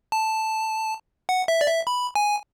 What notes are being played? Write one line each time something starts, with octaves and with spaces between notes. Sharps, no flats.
A5
F#5
E5
D5
E5
B5
G#5